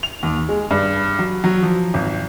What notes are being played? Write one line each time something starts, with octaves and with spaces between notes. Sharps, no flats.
F7
D#2
G#3
G2
F#3
F#3
F3
G#1